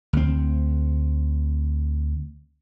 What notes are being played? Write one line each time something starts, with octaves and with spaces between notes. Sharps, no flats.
D2 C4